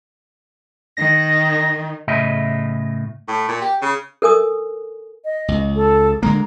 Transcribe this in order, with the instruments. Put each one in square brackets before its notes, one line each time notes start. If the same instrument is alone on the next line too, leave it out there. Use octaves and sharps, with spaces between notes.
[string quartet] D#3 [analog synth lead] A#6
[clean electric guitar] A2 C#3 D#5 E5
[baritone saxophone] A2
A#2
G4
C#3
[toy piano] A4 A#4 G#5 D#6
[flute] D#5
[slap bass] C#2
[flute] A4
[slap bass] D3 G#3 A#3 [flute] A#5